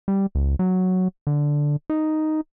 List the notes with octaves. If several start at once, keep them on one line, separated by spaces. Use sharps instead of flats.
G3
C#2
F#3
D3
D#4